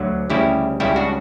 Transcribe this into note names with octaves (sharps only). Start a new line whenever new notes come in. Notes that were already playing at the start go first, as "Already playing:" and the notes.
Already playing: D2 D3 F#3
D2 C#3 G3 E4 G4
C#2 C#3 G3 E4 G4
D4 F#4